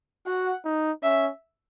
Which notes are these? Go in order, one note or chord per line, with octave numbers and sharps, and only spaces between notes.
F#4 F#5
D#4
C#4 E5